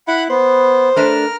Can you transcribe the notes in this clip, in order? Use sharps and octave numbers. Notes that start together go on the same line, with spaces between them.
E4 F#5 B5 F#6
B3 C5
A3 D4 A#4 B4 F6